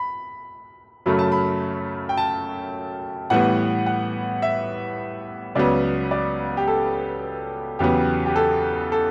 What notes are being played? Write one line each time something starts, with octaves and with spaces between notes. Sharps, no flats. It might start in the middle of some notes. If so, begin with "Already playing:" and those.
Already playing: B5
F#2 C#3 F#3 A3 B5
A5
B5
G5
A5
A2 E3 G3 B3 F#5
F#5
E5
C#2 C#3 F#3 B3 D5
D5
G4
A4
E2 C#3 F#3 B3 G4
G4
A4
A4